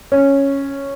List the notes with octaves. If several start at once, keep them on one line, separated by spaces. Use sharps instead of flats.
C#4